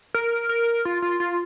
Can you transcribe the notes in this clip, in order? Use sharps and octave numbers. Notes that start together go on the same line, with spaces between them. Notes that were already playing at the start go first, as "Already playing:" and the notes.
A#4
A#4
F4
F4
F4